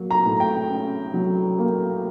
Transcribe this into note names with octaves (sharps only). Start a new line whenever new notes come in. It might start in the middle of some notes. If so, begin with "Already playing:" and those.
Already playing: F#3 A#3
A#5
A2
G5
C#4
F#3
A#3